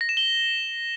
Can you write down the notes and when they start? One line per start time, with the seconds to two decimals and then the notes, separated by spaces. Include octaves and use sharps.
0.01 A#6
0.09 E7
0.17 G7